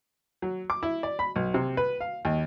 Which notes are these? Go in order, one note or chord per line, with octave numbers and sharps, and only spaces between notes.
F#3
D6
E4
D5
B5
B1
C3
B4
F5
D#2